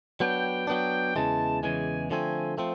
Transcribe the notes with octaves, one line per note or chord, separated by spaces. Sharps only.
F#3 B3 D4 G5
F#3 B3 D4 G5
E2 C#3 E3 G#3 A5
E2 C#3 E3 G#3 G#5
D3 F3 A3 C4 G#5
F3 A3 C4